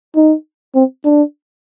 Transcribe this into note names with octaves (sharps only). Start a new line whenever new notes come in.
D#4
C4
D4